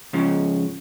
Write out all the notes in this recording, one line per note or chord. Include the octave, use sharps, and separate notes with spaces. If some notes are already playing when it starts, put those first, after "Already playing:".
G#2 C#3 F3 C#4